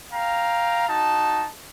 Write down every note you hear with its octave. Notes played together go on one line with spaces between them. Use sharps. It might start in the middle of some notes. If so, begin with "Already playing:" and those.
F5 G5 A#5
D#4 F#4 A5